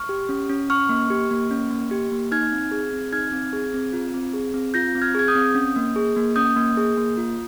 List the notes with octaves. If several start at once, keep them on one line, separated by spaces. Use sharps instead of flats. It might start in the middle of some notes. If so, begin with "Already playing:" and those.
Already playing: C#6 F6
G4
C#4
C#4
C#4 C#6 F6
A#3
G4
A#3
C#4
A#3
G4
A#3
D#4 F6 G#6
C4
G#4
C4
D#4 F6 G#6
C4
G#4
C4
F4
C4
G#4
C4
F4 G6 A#6
C4
F6 G#6
G#4 G#6
D#6 G6
C4
C#4
A#3
G#4
A#3
C#4 D#6 G6
A#3
G#4
A#3
F4